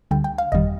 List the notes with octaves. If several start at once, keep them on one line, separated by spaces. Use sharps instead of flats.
D2 D3 G3 G5
G5
F5
G1 F2 D#3 G3 D#5